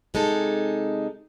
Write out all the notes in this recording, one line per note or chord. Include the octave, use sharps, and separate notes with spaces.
C3 G#3 D#4 A4